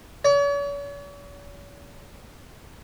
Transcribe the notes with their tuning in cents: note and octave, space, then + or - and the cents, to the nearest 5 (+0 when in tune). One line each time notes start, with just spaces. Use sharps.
C#5 +45